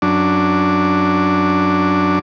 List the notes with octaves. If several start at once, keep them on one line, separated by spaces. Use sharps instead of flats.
F#2 D4